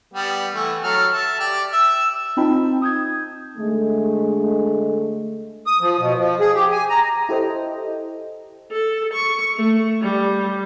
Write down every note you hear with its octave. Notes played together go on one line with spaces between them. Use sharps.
G3 B3
E3 A3
F#3 A4 F6
E5 A5
G4 D5
E5 E6
C4 D#4 F4 G5 A5 B5
D#6 G6 G#6
D3 G#3 A3
D#6
F3
B2
F3
G#4
G4
G#5
A#5
E4 G4 A4 C5 D#5 G5
A4
C#6
A3
G3